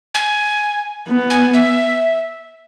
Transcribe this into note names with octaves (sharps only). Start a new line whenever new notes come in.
G#5
B3
G#5
E5